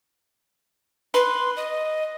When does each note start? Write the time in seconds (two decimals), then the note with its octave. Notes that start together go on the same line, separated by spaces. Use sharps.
1.14 B4 C6
1.56 D#5